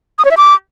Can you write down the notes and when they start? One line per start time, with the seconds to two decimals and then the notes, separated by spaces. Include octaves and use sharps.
0.19 D#6
0.25 C#5
0.31 E5
0.37 D6